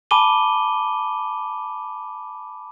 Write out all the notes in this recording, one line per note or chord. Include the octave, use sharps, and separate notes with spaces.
G#5 A5 B5 D6 D#7 G7